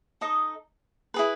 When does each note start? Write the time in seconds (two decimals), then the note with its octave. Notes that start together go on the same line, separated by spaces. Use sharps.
0.21 D#4 A4 D#5
1.14 E4 G#4 B4